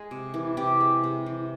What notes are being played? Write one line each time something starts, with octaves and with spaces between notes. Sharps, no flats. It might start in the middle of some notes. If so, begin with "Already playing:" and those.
Already playing: G#3 G#4
C3
E3
C3 G4
G#3
C3
E3